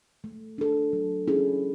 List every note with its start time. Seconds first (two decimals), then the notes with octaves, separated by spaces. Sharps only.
0.24 A3
0.58 D4 A4
0.93 F#3
1.28 C#4 E4 G#4